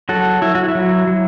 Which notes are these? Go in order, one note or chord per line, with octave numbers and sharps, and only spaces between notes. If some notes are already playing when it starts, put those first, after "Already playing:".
F#3 F#4 A4
F#3 E4
F#4
E4
F#3
F#3